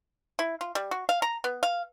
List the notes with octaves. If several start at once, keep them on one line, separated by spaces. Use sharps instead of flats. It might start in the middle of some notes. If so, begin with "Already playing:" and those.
E4
F4
G3
F#4
F5
A#5
B3
F5